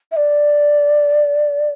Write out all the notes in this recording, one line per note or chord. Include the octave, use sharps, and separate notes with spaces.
E5
D5